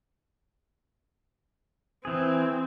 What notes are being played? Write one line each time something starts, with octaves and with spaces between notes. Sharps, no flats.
E3 C4 G#4